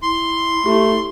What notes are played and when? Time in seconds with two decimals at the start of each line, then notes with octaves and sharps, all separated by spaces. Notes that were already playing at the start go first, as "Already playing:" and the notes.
0.02 E4 C6
0.66 A3 G4